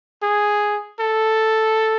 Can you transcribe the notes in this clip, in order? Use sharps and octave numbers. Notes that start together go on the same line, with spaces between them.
G#4
A4